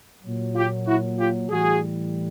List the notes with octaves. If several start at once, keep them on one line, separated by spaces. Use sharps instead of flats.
A#2 F#3
F4 G4
E4 F#4
F4 G4
A2 E3 G3 F#4 G#4